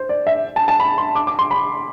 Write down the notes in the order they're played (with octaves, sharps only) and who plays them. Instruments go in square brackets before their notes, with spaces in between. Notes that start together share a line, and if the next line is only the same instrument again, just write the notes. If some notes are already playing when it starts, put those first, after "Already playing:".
Already playing: [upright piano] C5
D5
E5
A5
A5
B5
C6
D6
D6
C6
B5